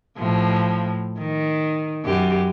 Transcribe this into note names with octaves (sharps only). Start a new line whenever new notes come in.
A2 F3
D#3
F#2 G4